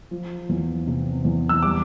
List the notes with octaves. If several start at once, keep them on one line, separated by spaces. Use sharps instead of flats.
F3
E2
C3
E2
E6
G3 D6